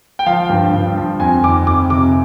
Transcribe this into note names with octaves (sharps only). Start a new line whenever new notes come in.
G5
F3 F5
G2 G5
G2
F3
F2 G#5
D#3 D6
F2 D6
C3 D6